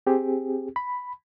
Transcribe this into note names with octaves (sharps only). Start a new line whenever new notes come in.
C4 G4 G#4
B5